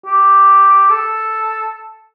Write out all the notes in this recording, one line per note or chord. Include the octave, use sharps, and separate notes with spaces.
G4
A4